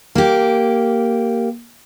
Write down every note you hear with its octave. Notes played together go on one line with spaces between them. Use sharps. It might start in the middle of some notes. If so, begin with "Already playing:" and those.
A#3 G4